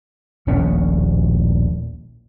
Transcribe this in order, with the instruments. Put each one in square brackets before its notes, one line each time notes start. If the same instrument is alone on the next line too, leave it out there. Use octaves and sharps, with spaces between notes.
[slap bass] D#1 A#1 A2 C#4